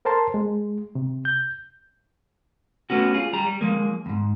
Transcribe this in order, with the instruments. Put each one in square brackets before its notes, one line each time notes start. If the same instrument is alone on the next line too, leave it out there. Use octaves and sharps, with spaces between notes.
[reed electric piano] A4 A#4 C5 A5 C6
G#3
C3
G6
[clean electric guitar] A3 B3 C#4 F#4
F4 G#4
G3 A#5
G3
F3 G#3 A#3
E2 G#2